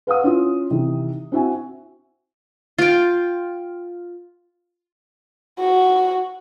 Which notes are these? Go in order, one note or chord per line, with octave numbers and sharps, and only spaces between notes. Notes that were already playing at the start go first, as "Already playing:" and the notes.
B4 F5 F#5 D#6
C#4 E4 F4
C3 D#3 E3
C4 E4 F#4 E5 G#5
F4 G5
F#4